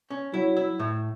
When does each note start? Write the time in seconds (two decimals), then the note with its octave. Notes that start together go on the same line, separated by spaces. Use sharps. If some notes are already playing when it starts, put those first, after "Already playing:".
0.10 C#4
0.34 F#3 E4
0.57 E4
0.79 A2